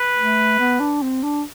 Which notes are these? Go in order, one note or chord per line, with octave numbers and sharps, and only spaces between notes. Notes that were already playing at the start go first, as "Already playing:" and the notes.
Already playing: B4
A3
B3
D4
C4
D4